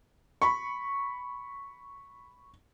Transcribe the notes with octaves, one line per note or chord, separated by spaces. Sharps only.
B5 C#6